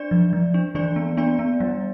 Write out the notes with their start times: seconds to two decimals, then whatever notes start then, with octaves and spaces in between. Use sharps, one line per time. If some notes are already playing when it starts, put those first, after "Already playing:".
Already playing: D4 D5
0.11 F3
0.33 F3
0.54 D4
0.75 E3 D4 D5
0.96 B3
1.17 B3 D4 D5
1.39 B3
1.60 G3